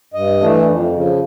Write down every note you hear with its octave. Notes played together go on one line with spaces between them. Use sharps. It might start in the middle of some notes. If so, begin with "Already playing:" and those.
G2 D#5
E3 A3 D4
F2
C#3 F3